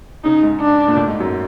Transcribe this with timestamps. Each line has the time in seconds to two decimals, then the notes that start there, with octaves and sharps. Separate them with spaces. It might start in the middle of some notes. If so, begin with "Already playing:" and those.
0.24 C#3 D#4
0.43 G#2
0.60 D4
0.88 A#2
0.96 A2
1.08 G#2
1.20 F#2